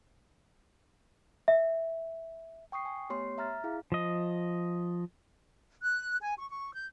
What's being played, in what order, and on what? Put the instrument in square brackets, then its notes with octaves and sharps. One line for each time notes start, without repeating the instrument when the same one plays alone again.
[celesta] E5
[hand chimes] G5 C#6 D#6 C7
G#5
A3 B3 G4 C#5 C6 C7
E5 A#5 F6 A6 B6
E4 G#4 F5
[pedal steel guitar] F3 D#5
[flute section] F#6
G#5
C#6
C#6
G6